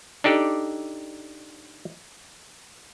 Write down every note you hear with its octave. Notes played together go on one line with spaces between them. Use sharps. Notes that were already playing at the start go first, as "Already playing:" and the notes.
D4 D#4 G4 A4 D5